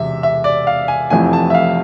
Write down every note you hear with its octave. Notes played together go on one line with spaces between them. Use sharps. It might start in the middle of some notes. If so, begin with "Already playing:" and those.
Already playing: E1 E2 C3 E5
E5
D5
F5
G#5
F1 F2 E3 A3 G#5
A5
E5
F5